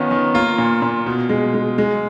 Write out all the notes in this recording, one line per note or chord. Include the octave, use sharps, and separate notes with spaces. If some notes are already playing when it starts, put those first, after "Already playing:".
Already playing: D#3 B3 C#4 F4
D#3
A#3 F4
A#2
A#2
B2
G#3
G#3
G#3